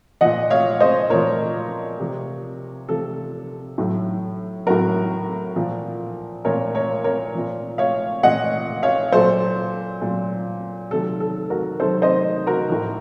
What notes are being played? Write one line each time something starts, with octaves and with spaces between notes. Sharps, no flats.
A#2 F3 D#5 F#5
C#5 F5
C5 D#5
A#2 F3 A#4 C#5
C3 F3
C3 F3 A4
A2 F#3
A2 F#3 F#4 A#4
A#2 F3
A#2 F3 A#4 C#5
A#4 C#5
A#4 C#5
A#2 F3
C#5 F5
A#2 F3 D#5 F#5
C#5 F5
A#2 F#3 A4 C5
A#2 F#3
C3 D#3 F#3 A4
A4
F#4 A#4
C3 D#3 F#3 A4 C5
C5 D#5
F#4 A#4
A2 F3